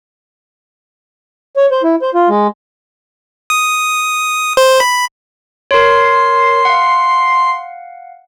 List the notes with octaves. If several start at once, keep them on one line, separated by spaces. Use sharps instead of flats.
C#5
C5
E4
C5
F4
G#3
D#6
C5
B5
A#4 C#5 C6
F5 F#5